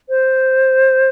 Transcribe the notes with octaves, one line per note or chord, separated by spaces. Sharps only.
C5